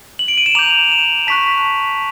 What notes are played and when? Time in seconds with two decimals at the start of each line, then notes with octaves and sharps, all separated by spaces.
0.19 F#7
0.28 D7
0.38 D#7
0.46 E7
0.55 A#5 D6 G6 F7
0.92 E7
1.27 A5 C#6 F#6 B6